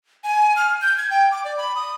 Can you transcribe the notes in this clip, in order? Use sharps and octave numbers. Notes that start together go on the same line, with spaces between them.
G#5
F6
G6
G#6
G5
D6
D5
B5
D#6